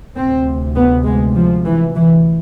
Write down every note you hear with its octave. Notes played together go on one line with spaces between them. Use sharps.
D2 C3 C4
B3
G#3
F3
E3
E3